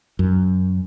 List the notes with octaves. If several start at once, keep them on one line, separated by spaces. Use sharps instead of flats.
F#2